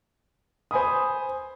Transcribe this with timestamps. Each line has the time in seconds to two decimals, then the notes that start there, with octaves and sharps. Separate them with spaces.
0.71 C5 G#5 B5 D#6